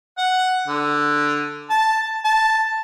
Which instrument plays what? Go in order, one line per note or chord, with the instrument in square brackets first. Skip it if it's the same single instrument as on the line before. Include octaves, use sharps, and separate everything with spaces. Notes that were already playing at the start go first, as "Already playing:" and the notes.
[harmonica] F#5
D3
A5
A5